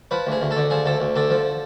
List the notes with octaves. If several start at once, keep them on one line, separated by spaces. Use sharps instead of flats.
F3 B4
D2 G#4
D2
A4
D3
F3 G#4
D2 A4
D2
D3 A4
F3